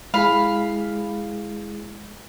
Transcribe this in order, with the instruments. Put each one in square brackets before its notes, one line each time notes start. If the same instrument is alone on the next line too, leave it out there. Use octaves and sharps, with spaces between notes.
[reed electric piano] G#3 E4 G#4 [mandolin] F5 B5